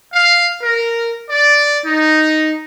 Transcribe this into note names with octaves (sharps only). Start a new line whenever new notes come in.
F5
A#4
D5
D#4